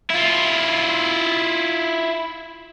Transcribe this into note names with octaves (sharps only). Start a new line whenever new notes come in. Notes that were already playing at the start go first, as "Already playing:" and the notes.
E4 F4